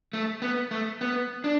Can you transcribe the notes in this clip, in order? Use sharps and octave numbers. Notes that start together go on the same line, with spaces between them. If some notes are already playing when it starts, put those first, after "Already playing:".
A3
B3
A3
B3
D4